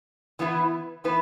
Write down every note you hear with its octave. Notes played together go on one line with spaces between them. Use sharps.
E3 B3 E4 B4
E3 B3 E4 B4